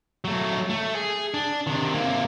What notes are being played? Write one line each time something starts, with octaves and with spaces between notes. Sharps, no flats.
F#3 A3
A3
G#4
D4
C3 D#3
C3 A#3